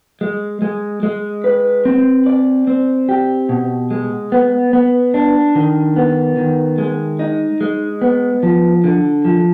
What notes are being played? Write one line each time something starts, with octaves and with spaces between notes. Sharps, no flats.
G#3
G#3
G#3
B4
C4
D5
C4
G4
B2
G#3
B3
B3
D4
D#3
B3
D#3
G#3
D#4
G#3
B3
F3
D3
F3